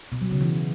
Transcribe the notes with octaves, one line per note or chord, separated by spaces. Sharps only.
B2
F#3
C#3
E3